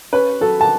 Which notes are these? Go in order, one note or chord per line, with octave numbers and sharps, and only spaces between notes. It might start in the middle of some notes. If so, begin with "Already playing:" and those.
C#4 B4
F#3 A4
A5